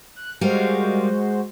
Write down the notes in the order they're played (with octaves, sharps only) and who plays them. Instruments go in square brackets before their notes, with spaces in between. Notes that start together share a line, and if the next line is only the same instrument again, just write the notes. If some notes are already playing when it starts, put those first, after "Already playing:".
[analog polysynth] F#6
[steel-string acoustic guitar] G3 A#4 F5 [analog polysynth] G#3 F#4 C5